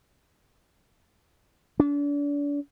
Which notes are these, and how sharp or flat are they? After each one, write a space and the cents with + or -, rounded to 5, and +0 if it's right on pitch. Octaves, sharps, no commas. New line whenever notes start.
D4 -35